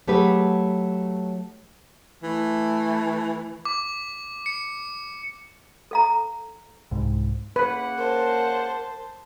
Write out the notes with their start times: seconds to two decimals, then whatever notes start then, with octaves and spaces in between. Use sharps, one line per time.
0.07 F#3 A3 G4 G#4 B4
2.23 E3 A3
3.65 D6
4.46 C#7
5.91 A4 F5 A#5
6.91 C2 G#2
7.56 C#3 A#3 B4 F#5
7.98 A#4 C5 A5